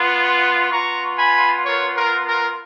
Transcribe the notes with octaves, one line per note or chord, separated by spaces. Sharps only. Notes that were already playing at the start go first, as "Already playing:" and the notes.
Already playing: B3 F4
B3 F4 A#5 C#6
G#5 B5
A#4 C#5
A#4
A#4